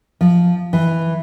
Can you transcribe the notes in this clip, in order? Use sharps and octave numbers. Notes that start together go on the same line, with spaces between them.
F3
E3